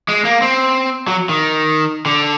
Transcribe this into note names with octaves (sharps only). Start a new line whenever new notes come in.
G#3
A#3
C4
F#3
D#3
D3